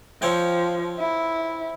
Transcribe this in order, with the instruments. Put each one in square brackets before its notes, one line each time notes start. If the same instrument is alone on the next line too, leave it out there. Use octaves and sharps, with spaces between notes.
[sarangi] F3 [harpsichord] C4 C#5 G5
[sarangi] E4